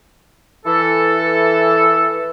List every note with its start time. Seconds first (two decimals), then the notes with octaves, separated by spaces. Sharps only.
0.66 E3 A4